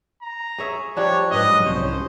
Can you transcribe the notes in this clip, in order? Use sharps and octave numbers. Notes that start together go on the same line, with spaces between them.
A#5
G#4 C#5 E5
F3 G3 D4 C#5
G#2 F#3 D4 B4 D#5
C2 C#4 C5 C#5